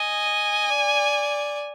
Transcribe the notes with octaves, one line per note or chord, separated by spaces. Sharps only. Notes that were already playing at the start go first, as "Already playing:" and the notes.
Already playing: D#5 G#5
D5